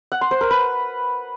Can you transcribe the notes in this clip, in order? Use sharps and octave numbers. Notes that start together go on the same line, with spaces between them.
F#5
C6
C5
A#4
B4